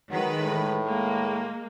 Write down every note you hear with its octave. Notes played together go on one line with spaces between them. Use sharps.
D#3 F#3 G#3 B4
A2
G#3 A#3